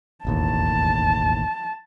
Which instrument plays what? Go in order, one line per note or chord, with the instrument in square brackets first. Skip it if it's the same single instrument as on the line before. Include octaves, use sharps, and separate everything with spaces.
[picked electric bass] E1 A1 D#2 [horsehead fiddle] A5